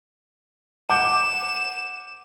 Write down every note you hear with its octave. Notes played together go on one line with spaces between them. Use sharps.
F#5 D6 G6 E7